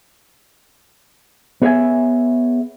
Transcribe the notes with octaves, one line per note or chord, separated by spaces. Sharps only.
B3 G#4 C#5 D5 E5 G#5